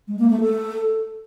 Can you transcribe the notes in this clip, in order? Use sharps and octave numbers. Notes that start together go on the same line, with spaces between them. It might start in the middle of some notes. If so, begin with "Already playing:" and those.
G#3
A#3
A3
A4